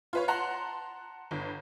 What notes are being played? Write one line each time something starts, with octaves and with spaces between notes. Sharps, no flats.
F4 B4 C#5
F#5 A5 A#5 C6 F#6
G1